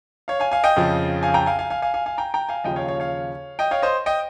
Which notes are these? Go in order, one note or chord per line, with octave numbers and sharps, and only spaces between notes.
C#5 F5
F5 G#5
F5 G#5
D#5 G5
F2 C#3 F3
F5 G#5
G5 A#5
F5 G#5
F5 G#5
F5 G#5
F5 G#5
F5 G#5
F5 G#5
G5 A#5
G5 A#5
F5 G#5
D#2 C#3 F3 D#5 G5
C#5 F5
C#5 F5
C#5 F5
D#5 G5
C#5 F5
C5 D#5
D#5 G5